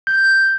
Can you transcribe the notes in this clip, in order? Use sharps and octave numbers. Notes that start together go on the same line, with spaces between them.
G6